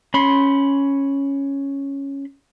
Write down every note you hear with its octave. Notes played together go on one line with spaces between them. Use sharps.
C#4 B5 C6